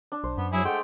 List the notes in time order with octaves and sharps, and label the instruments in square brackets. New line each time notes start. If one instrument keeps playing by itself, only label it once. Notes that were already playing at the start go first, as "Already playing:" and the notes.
[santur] D4
[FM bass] B1 [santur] C5
[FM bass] F#2 [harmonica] B3
[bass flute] F#3 [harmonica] E4 G#4
[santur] G#3 [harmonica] A3 G5 [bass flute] F#5